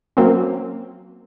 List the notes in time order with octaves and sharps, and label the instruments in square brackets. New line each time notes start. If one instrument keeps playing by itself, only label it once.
[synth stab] F#3 A#3 C4 C#4